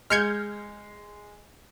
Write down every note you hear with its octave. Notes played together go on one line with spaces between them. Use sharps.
G#3 F6 G6 G#6 C#7